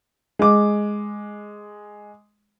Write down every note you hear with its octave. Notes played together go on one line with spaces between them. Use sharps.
G#3 D6